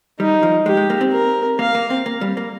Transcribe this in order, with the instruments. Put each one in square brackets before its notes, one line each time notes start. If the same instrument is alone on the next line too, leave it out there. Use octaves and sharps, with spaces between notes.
[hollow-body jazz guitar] G3 [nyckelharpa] D#4
[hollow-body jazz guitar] F3
[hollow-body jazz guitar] G#3 [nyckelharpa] G4
[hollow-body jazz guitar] G#3
A#3
C4
[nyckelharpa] A#4
[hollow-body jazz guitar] A#3 [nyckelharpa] F5
[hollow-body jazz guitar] A#3
C4
A#3
G3
A#3